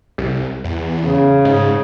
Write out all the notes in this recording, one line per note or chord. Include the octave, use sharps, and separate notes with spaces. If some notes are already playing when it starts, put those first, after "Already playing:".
C2
E2
C#3
G#2